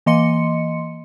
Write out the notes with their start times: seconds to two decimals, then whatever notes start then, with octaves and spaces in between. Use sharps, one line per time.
0.06 E3 A#3 D#5 C6 C#7